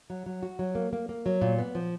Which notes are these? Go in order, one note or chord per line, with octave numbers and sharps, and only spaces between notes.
F#3
F#3
F#4
F#3
A#3
A#3
A#3
F#3
A#2
B3
F3